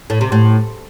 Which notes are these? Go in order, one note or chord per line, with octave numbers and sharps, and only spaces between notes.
A2
C3
A2